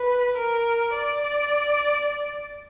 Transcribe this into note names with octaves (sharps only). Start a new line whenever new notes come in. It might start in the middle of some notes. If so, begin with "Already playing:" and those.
Already playing: B4
A#4
D5